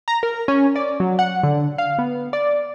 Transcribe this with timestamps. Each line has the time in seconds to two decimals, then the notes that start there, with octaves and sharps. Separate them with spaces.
0.08 A#5
0.23 A#4
0.48 C#4
0.76 D5
1.00 F#3
1.19 F#5
1.43 D3
1.78 F5
1.98 B3
2.33 D5